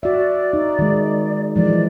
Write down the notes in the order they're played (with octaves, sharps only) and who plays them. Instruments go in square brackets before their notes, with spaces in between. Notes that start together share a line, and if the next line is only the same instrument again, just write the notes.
[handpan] F#4 E5 [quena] D5
[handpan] D#4
D#3 G#3
[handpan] E3 F3 G#3 [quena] D5